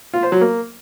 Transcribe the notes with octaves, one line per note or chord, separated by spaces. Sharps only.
F4
C5
F#3
A#3